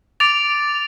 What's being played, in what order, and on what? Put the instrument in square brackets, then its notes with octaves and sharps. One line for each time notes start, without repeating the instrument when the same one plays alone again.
[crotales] D6 A6 D7 F7